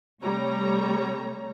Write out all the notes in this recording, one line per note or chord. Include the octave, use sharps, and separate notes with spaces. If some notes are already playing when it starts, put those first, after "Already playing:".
C3 G3 A3 C#5 A#5